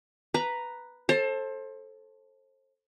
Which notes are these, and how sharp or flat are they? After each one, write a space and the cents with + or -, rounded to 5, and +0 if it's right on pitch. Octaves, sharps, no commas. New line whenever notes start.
B4 +0 A#5 +0
A4 +0 C5 +30